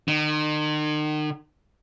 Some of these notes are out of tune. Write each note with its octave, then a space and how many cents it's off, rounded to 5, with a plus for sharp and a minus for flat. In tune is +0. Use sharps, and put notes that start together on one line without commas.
D#3 -40